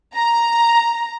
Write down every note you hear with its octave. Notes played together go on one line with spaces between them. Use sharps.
A#5